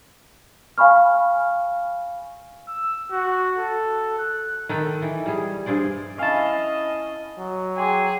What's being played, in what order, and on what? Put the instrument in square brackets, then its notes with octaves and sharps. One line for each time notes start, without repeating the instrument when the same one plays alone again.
[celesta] F5 G#5 B5 C#6 F6
[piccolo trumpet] E6
F#4
A4
F#6
[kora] D#3 A4 B4 G5
E3
G3 G#4
G2 G#4 C5 D5
[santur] C#4 E4 [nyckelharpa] D#5 [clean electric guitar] F5 A5
[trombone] F#3
[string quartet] G#4 [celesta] G5 C6 D6